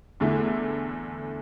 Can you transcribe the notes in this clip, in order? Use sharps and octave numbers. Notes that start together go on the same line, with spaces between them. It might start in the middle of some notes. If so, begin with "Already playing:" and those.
E2 D3 A3 E4